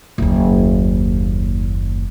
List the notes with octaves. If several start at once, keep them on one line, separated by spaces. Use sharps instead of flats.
F#1 D#2